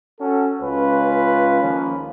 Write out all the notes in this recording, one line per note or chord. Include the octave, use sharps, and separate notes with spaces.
C#4 F#4 A4
C#2 C#4 F4 B4
D#3 F3 A#3 C#4